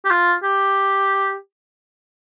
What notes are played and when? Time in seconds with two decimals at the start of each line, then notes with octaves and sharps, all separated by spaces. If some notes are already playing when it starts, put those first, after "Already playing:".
0.05 G4
0.11 F4
0.43 G4